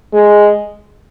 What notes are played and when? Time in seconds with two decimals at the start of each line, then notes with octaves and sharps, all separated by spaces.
0.13 G#3